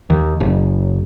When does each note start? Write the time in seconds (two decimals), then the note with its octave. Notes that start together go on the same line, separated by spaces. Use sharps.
0.10 D#2
0.40 F#1